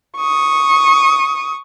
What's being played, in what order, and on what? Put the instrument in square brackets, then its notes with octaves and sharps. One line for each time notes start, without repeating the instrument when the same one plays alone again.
[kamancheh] C#6 D#6